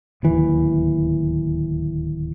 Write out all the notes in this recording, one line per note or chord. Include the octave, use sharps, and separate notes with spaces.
D1 D#2 E3